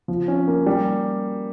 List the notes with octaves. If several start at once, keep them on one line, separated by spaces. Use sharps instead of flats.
F3
C#4
A#3
G3